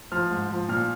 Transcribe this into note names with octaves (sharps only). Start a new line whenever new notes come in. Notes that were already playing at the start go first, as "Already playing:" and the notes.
F3 F6
G#2
F3
A#2 F6